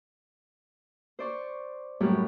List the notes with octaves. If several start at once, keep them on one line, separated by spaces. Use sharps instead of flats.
C5 D5 C#6
F#2 A2 G3 G4 C#5